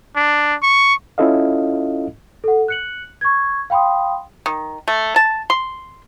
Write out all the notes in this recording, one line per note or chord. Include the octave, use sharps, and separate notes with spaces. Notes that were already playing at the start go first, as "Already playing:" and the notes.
D4
C#6
C#4 E4 F4 A4 D#5 F5
A4 F#5
F#6 C#7 F#7
C#6 G#6
F5 G5 B5 C6 D#6
D#3
A3
A5
C6